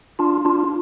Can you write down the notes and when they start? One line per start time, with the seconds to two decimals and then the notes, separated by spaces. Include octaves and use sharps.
0.19 D4 F4
0.45 D4 F4